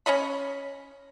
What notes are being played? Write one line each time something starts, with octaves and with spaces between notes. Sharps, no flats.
C#4 C#5 D#5 B5